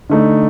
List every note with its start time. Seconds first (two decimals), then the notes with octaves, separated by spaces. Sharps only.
0.10 D3 A3 D#4